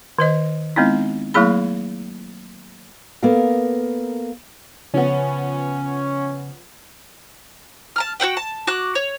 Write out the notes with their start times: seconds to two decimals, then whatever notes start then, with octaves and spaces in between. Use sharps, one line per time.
0.19 D#3 C5 D#5
0.76 G#3 B3 C4 D#4 E4
1.34 F#3 A3 A#3 E4 G#4 B5
3.23 A#3 B3 A4 A#4 F5
4.94 C#3 F3 B3 C#4
7.96 A5 A#5 F6
8.20 F#4 C5 F#5 G5
8.37 A5
8.67 F#4 D6 F#6
8.95 C#5